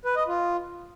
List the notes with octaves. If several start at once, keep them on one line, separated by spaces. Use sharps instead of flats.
B4
D#5
F4